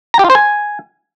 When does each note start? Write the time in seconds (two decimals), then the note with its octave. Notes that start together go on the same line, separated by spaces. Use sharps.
0.14 A#5
0.19 G4
0.25 F4
0.30 C5
0.35 G#5